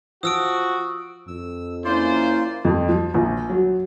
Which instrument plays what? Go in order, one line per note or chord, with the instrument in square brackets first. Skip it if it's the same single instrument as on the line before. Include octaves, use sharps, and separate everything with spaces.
[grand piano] F3 [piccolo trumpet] F#4 [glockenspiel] D#6 E6 D7
[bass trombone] F2 [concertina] E6
[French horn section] A#3 C#4 E4 [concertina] F4 D5 C6 [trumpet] C5
[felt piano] F2
F3
A#1
F#3